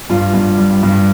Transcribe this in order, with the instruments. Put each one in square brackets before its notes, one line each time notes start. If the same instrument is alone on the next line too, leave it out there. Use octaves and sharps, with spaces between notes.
[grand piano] G2 F4
G2
G3
G2